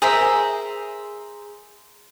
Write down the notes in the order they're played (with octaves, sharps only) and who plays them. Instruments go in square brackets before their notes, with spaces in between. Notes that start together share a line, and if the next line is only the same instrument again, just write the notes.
[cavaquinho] G#4 A#4 C5 E5